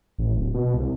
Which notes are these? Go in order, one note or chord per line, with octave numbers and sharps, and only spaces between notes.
A1
D1
B2
C2